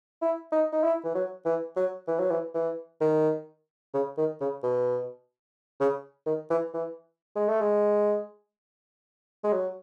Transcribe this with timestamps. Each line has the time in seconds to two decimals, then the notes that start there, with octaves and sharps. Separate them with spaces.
0.22 E4
0.52 D#4
0.73 D#4
0.83 E4
1.04 E3
1.15 F#3
1.45 E3
1.76 F#3
2.07 E3
2.19 F#3
2.31 E3
2.55 E3
3.01 D#3
3.94 C#3
4.18 D#3
4.41 C#3
4.63 B2
5.80 C#3
6.26 D#3
6.50 E3
6.74 E3
7.36 G#3
7.48 A3
7.61 G#3
9.44 G#3
9.53 F#3